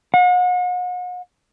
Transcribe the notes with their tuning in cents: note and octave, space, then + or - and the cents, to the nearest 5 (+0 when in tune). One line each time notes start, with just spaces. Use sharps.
F#5 -40